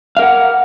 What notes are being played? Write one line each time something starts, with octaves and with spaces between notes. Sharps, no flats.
A#4 F5 F#5